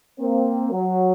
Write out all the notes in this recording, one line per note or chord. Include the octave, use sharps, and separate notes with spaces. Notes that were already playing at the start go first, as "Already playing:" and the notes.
A#3 C4
F#3